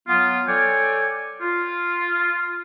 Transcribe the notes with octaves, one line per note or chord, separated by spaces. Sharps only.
F#3 B3 F4
A4 C#5 D5 G5 G#5
F4